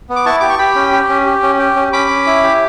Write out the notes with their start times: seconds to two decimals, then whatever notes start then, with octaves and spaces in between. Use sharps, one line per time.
0.09 B3
0.16 D6
0.26 E4 A5 C#6
0.40 G4 D6
0.50 C#6
0.59 G4 G5 B5
0.75 C#4
0.92 G4
1.09 C#4
1.26 G4
1.43 C#4
1.59 G4
1.76 C#4
1.93 C#4 B5 D6
2.10 C#4
2.27 E4
2.44 G4